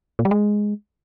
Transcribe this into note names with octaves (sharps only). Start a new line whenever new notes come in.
A#2
G3
G#3